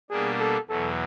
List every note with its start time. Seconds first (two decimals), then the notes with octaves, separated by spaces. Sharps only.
0.10 B2 G3 A#3 D4 G#4
0.40 A4
0.68 E2 B2 F#3 A4